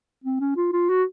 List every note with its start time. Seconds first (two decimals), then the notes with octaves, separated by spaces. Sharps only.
0.24 C4
0.40 C#4
0.56 F4
0.73 F4
0.89 F#4